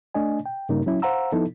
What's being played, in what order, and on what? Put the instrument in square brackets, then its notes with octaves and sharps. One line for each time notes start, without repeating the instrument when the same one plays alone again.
[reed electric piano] A3 D4 D#5 G#5
G5
G2 C#3 A#3 D#4 A#4
F#3 C#4 E4
C5 F5 F#5 A#5 E6
F3 B3 D#4 E4 A4